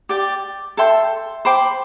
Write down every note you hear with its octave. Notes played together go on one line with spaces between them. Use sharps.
G4 D5 G5
A4 E5 G5 C6
C5 G5 B5 D6